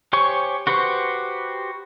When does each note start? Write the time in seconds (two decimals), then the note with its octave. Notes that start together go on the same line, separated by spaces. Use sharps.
0.13 G4 C5 C#5 G#5 C#6
0.67 F#4 G4 B4 C5 C#6